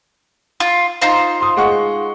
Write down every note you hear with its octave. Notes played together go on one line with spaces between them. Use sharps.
F4
D#4 F4 C5
C6 D#6
G#3 F#5 C#6